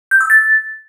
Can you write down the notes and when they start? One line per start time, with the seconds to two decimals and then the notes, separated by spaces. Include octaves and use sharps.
0.11 G6
0.21 E6
0.30 A6